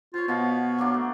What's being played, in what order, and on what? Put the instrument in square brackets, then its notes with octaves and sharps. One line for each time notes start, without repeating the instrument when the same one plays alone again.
[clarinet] F4 [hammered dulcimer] C5 C#5
[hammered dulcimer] B2 F5 B5 [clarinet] B3
[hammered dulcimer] F#3 A#3 D4
A3